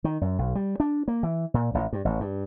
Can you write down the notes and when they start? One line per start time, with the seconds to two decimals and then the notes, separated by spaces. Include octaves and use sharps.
0.04 D#3
0.21 F#2
0.38 B1
0.55 G3
0.80 D4
1.08 A#3
1.23 E3
1.54 A#2
1.74 A1
1.93 G2
2.05 A1
2.20 G2